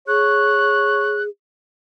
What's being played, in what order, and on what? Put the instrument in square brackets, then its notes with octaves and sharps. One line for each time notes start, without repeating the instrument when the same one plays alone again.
[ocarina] G#4 [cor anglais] C#5 [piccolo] F#6